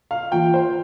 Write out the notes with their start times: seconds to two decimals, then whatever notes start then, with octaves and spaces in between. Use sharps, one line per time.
0.11 F5
0.32 E3 A#3 F4 G5
0.54 C5